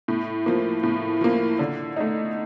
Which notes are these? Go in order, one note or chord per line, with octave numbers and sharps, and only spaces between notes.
A2
F3 A#3
A2
F3 A#3
D3
A3 D#4